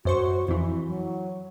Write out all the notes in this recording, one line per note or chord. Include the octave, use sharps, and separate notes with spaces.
F#2 F#4 C5 C#6
F2 E3 E4
F#3